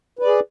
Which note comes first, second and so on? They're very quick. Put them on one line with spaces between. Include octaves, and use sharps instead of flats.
B4 D5 G#4